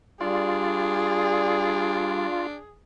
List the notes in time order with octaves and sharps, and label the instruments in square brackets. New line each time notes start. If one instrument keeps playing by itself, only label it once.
[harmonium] G3 [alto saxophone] D4 [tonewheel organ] F4 [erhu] G#4